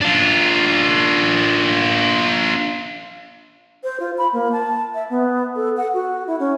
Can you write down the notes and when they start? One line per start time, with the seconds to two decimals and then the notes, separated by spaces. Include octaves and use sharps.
0.01 D4 F4
3.84 C5
4.00 F4
4.18 B5
4.33 A#3
4.52 A5
4.94 E5
5.10 B3
5.56 A4
5.77 F#5
5.94 F#4
6.27 E4
6.39 C#4